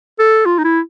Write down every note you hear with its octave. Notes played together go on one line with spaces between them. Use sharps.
A4
F4
D#4
E4